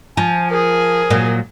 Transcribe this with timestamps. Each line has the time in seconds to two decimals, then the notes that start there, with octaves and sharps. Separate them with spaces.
0.17 F3 G#5
0.51 G#4 A#4
1.10 A#2 F#3